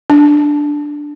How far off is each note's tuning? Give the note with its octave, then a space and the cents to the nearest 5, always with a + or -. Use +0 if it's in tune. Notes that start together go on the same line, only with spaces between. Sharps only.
D4 +0